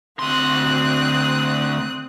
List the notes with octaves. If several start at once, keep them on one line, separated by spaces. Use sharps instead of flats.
D2 C4 C6 D#6 F#6